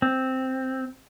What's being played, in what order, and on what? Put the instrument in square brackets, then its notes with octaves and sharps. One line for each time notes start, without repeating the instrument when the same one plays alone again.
[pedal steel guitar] C4